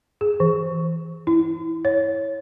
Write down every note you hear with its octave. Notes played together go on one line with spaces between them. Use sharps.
G#4
E3
E4
C#5